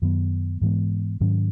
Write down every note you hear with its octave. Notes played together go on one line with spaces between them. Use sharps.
F#2 D#3 F#3 B3
G#2 E3 G#3 B3
G#2 D#3 F#3 C#4